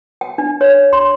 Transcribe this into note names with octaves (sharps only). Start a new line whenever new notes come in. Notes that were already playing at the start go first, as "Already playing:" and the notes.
G5
D4
C#5
C6